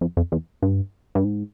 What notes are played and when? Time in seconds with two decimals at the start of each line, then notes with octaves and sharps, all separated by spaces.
0.01 F2
0.17 F2
0.32 E2
0.62 G2
1.15 G2
1.25 G#2